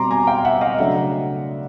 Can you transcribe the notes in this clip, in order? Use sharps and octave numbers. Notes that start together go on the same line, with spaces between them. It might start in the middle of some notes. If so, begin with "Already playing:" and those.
Already playing: B2 G3 C4 A#5 C6 D6
G#5 A#5
F5 G5
E5 F#5
D#5 F5
C#3 F#3 A3 D4 E5 F#5